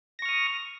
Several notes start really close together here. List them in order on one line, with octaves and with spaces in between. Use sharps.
A#6 C#6 F6 D#6